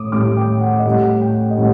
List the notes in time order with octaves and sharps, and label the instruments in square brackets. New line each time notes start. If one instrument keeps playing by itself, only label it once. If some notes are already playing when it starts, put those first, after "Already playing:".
Already playing: [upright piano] A2 D6 D#6
A2 G3 D6
G5
F#5
D#5
A2 G3 F#5
G5
D#5
A2 G3 F#5